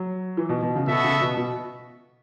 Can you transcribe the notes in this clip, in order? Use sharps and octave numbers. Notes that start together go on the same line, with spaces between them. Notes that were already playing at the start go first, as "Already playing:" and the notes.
Already playing: F#3
E3
B2
B2
C#3
B2 B3 F#4 A4 E5
C#3
B2
B2